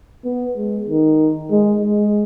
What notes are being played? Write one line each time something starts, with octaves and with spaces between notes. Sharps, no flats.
B3
G#3
D#3
G#3
G#3